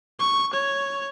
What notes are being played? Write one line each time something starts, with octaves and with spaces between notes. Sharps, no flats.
C#6
C#5